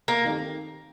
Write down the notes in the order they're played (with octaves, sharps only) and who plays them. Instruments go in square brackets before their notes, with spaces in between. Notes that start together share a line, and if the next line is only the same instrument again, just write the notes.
[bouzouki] A#3
[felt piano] D#3 A3 C4 D#4 G4